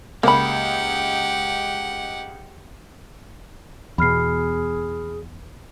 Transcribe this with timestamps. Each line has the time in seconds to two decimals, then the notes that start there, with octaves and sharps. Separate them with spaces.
0.23 C#2 A#3 G4 F#5 B5
3.98 E2 B2 G#4 B5 F6 C7